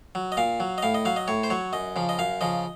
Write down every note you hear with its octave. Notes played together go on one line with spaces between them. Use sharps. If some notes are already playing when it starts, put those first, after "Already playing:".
F#3
D#5
A#2 F5
F#3
D#5
A2 F5
D#5
F#3 F5
D#5
A2 C#5
C5
F#3 C#5
F#2 D#5
C#3 F3
D#5
F#2 F5
C#3 F3 D#5